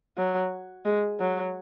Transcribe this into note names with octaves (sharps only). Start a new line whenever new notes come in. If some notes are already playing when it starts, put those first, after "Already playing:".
F#3
G#3
F#3